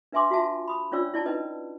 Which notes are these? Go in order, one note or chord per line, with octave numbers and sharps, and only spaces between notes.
D4 B4 E5 G#5 C6 D6
F4 F#4 E5 A5
B5 D#6
C#4 D4 F4 C#5 D5 E6
E4 D5 A5
C#4 D#4 B4 D#5